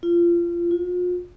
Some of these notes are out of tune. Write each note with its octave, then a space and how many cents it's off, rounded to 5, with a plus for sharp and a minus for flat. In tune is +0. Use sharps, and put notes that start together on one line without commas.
F4 -25
F4 +40